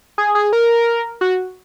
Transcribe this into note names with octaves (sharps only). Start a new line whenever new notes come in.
G#4
G#4
A#4
F#4